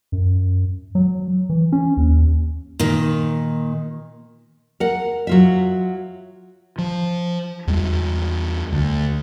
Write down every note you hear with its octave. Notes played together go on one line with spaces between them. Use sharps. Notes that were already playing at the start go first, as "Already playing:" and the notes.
F#2
F#3
E3
C#4
D#2
A#2 D#3
A#4 F#5
F#3 F4 E5
F3
E2 G3
D2